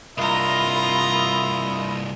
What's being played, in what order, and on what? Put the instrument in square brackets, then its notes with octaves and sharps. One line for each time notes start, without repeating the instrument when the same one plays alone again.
[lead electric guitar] C2 G2 [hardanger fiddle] F4 A#5 [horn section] A#4 D#5 E5 [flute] B5